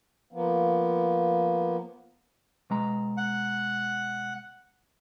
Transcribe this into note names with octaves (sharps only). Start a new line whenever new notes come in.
F3 A#3 B3
B2 G#3 A#5
F#5